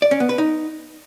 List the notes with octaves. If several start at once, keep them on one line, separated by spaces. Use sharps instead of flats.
D5
C#4
B3
B4
D#4